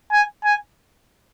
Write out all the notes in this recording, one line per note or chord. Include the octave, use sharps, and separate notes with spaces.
G#5
G#5